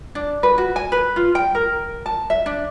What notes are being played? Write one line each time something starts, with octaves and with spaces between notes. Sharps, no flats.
D4
B4
F#4
G#5
B4
F4
G5
A#4
A5
E5
D4